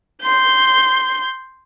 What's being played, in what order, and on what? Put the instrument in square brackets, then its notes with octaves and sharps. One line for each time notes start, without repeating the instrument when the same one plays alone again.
[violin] C6 G6